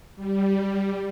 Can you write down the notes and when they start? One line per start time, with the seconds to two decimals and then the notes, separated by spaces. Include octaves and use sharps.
0.16 G3